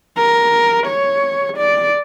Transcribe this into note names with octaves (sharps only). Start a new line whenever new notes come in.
A#4
C#5
D5